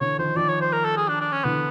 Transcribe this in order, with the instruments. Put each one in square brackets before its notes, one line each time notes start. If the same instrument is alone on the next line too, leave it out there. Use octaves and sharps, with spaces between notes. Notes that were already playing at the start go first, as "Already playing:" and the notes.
[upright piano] D3 E3 [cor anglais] C#5
[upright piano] D#3 F3 [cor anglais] C5
[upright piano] D#3 F3 [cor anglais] D5
[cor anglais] C#5
C5
A#4
A4
G#4
D4
D4
C#4
[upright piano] D3 E3 [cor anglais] B3